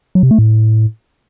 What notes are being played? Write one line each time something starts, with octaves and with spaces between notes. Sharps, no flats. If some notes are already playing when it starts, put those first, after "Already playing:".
F#3
C3
A3
A2